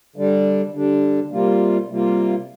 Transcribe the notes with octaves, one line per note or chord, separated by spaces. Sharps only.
D3 G3 D4
D3 G3 D4
C3 G3 A#3 F4
C3 G3 A#3 F4